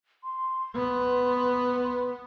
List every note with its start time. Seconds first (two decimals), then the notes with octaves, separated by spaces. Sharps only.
0.24 C6
0.75 B3